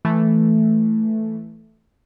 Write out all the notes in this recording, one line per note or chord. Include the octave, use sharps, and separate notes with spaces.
E3 A3